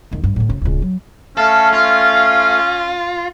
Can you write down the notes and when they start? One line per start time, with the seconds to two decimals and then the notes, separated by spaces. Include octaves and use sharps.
0.12 E2 D#3
0.24 G2
0.36 A2 D3
0.49 F1 C#3
0.61 D1 C#2
0.82 F#3
1.37 A3 C#4 A4 F5
1.73 F4